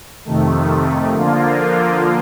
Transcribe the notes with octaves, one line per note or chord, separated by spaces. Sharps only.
F2 C3 D#3 A3
D3 F3 A#3 F4